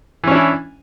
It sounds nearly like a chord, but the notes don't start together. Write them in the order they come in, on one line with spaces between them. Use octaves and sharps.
E3 C#4 D4 E4